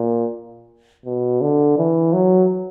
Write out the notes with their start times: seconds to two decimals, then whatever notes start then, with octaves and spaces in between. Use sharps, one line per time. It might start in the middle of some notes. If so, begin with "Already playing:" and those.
Already playing: A#2
1.06 B2
1.41 D3
1.78 E3
2.13 F#3